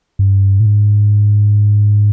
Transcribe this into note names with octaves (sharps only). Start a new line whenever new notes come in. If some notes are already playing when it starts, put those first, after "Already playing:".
G2
A2
G#2